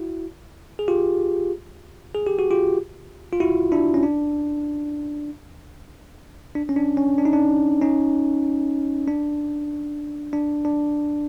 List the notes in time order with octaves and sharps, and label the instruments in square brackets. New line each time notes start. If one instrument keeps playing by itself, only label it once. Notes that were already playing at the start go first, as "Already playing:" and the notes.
Already playing: [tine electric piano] E4 F#4
G#4
F4 G4
G#4
G4
F#4
F4 G4
F4
E4 F#4
D4 E4
C#4
D4
D4
C#4
D4
C#4
D4
D#4
D4
C#4 D#4
D4
D4
D4